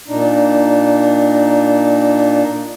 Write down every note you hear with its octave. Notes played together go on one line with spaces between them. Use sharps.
A#2 D4 D#4